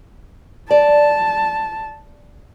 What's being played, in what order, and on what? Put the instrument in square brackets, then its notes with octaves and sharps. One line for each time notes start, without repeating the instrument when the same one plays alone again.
[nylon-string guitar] D5 [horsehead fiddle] A5